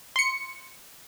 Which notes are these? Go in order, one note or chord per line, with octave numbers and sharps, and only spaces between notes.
C6 C#7